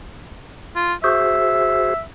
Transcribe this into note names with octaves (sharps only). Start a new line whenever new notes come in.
F4
F#4 G#4 C5 E5